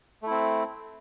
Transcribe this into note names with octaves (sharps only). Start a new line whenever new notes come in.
A3 C4 E4